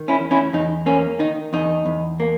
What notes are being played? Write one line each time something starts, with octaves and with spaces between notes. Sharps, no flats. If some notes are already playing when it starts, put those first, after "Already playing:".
Already playing: D#3
C#4 E4
E2
C#4 E4
E2 D#4
A#3 C#4
D#3 D#4
E2 D#4
E2
A#3